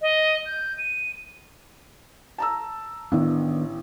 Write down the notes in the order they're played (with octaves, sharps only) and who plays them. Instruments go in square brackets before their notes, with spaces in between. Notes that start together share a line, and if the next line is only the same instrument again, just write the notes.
[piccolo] D#5
G6
D#7
[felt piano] A5 A#5 E6
[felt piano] A1 [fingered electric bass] D#3 B3 D4